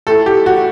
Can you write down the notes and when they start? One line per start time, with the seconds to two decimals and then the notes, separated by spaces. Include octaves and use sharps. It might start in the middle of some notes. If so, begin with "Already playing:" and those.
0.07 A2 A3 A4
0.26 G4
0.46 F#4